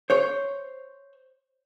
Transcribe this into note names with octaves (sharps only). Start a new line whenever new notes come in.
C5 C#5